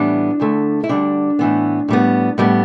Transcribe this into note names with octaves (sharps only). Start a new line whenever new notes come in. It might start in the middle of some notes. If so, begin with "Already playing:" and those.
Already playing: A2 E3 G3 B3 D4
D2 D3 A3
E4
D2 D3 G3 D4
A2 E3 B3
A2 G3 B3
A2 G3 B3